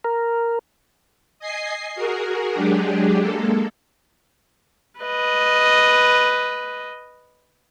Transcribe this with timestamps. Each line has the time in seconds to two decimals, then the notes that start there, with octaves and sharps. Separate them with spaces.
0.04 A#4
1.39 D#5 G#5 C7
1.95 F#4 G#4 A#4
2.53 F#3 G#3 D4 G4 G#4
3.20 G#3 A#3 A4
5.00 B4 D#5